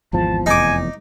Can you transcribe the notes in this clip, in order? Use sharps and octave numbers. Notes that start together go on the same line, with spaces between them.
G#1 E2 F3 A5
F1 E2 D#4 G#5 D6